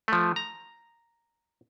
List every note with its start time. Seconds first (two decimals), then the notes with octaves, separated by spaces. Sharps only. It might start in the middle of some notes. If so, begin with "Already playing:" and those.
0.08 F3 A3
0.36 A#5